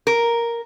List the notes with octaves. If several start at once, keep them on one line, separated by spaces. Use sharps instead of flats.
A#4